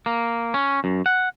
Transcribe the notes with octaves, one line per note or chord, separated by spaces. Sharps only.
A#3
C#4
F#2
F#5